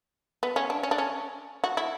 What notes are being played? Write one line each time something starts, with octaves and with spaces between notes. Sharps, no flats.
B3
C#4
D4
C#4
D4
C#4
F#4
E4